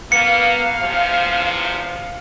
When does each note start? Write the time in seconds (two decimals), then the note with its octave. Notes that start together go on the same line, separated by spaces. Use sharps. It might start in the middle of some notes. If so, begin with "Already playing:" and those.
0.12 A#3 B3 F5 C#7
0.81 E2 C3 F3